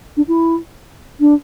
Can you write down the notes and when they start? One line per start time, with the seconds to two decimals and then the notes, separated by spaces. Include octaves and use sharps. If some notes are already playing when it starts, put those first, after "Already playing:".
0.16 D4
0.28 E4
1.20 D4